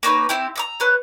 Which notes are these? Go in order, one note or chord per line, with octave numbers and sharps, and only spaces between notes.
A#3 C#4 D#4 B4
C4 E4 G4
A#5 D6 E6
B4 C#5